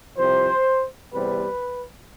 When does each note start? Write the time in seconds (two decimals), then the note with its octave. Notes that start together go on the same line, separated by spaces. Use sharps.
0.16 C2 C3 F3 C5
1.12 E2 C3 G3 C4 B4